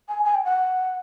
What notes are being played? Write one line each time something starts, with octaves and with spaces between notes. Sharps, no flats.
G#5
G#5
G5
F#5